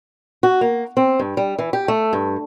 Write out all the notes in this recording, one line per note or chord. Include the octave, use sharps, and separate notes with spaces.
F#4
A#3
C4
G2
G3
E3
G4
A3
G2